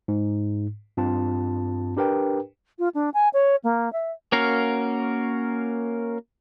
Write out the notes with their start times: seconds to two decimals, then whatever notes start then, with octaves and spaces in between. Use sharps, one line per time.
0.08 G#2
0.97 G2 C4 F4 A5
1.97 D4 G4 A#4 B4 G5
2.79 F4
2.95 D4
3.14 G#5
3.33 C#5
3.64 A#3
3.93 E5
4.32 A#3 C#4 F#4 A#4 F5